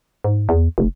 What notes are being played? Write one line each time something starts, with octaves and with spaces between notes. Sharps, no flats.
G#2
E2
F1